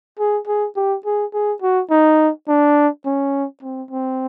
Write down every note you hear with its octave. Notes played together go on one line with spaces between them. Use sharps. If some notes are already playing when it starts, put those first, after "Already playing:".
G#4
G#4
G4
G#4
G#4
F#4
D#4
D4
C#4
C4
C4